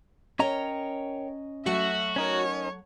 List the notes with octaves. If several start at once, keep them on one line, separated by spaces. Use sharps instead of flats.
C#4 A#4 C#5 D#5 G5 A#5
F#3 A3 F#4 E5 F#5
C#4 D#4 A#4 C#5